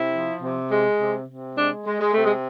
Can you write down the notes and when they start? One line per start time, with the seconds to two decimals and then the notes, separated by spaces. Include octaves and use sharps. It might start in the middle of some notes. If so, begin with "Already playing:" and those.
Already playing: C3 E4
0.12 F3
0.41 C3
0.70 G#3
0.99 C3
1.27 C3
1.56 G#3 D4
1.86 G#3
2.00 G#3
2.11 C3 A3
2.24 G#3